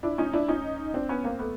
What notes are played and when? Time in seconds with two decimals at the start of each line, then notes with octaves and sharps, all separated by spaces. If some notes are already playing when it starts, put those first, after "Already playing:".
0.03 D4 E4
0.18 C#4 D#4
0.33 D4 E4
0.48 C#4 D#4
0.94 C4 D4
1.09 B3 C#4
1.24 A#3 C4
1.39 A3 B3